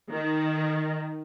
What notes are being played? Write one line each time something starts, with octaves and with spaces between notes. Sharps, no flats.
D#3